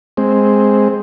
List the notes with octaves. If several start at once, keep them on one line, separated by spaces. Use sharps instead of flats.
G#3 C4